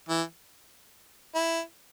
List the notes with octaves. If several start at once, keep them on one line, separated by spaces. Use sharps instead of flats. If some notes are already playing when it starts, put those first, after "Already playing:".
E3
E4